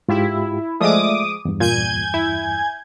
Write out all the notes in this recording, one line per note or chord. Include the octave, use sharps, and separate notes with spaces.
G#2 E4 F4 G4
F3 G#3 A3 D5 E5 D6 D#6
E2 G2
A#2 G#5 G6 G#6
E4